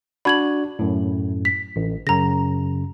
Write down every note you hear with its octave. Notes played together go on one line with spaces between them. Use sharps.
D4 F#4 D5 B5 G#6 F#7
F#2 A2
B6
A1
F#2 C#3 A#5 A#6